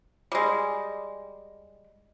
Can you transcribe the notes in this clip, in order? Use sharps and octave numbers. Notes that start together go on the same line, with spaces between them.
G3 G#3